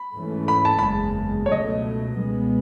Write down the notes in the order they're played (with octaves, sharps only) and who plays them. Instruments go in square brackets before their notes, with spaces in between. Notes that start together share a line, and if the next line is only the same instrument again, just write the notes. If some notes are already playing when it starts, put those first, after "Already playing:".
Already playing: [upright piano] B5
[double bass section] G#2 E3 A3 C#4
[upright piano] B5
A5
B5
[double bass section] F#1 E2 C#3 G#3 [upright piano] A5
[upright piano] C#5
[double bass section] C#2 B2 F#3 A3 [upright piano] D#5
[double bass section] C#2 B2 G#3 B3